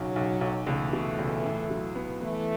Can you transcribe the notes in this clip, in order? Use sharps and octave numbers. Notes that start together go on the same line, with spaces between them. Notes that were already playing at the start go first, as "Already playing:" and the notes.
Already playing: B1 C#3 F#3
B1
B1
C#2 E3 A3
B2
C#2
A2
F#3
B3
E3 A3 B3